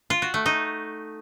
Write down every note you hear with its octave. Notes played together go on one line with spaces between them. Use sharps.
F4
F#4
A3
D#4